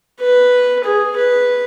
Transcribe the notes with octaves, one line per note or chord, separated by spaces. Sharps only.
B4
G#4
B4